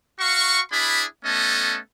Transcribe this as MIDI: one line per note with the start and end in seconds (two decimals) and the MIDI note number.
0.20 0.60 66
0.20 0.60 77
0.20 0.60 85
0.71 1.03 62
0.71 1.03 64
0.71 1.03 68
0.71 1.03 83
1.25 1.78 57
1.25 1.78 59
1.25 1.78 61
1.25 1.78 69
1.25 1.78 75